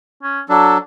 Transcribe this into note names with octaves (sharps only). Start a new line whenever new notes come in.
C#4
F#3 D4 A4